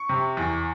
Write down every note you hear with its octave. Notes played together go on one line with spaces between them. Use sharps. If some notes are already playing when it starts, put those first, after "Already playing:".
Already playing: C#6
C3
E2